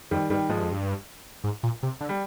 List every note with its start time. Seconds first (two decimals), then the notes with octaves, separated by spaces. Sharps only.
0.11 F2 D#3 G3
0.30 G2 D#3 G3
0.49 G#2 F3 G#3
0.57 G2
0.64 F2
0.72 G2
1.44 G#2
1.63 A#2
1.83 C3
2.01 D3
2.09 G3